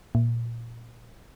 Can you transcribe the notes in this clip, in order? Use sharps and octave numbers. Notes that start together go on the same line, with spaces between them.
A#2